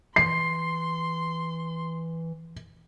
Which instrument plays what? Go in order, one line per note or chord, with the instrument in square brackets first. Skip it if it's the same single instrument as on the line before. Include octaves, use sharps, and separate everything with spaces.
[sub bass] E3 [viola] C6 [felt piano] C7